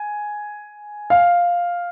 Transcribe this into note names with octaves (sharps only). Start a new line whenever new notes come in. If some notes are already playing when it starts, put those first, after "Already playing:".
Already playing: G#5
F5